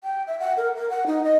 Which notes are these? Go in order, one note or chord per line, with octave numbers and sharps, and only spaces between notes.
G5
E5
F#5
A#4
A#4
F#5
D#4
D#5